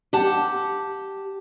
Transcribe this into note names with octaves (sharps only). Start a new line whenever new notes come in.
G4 F#5 A5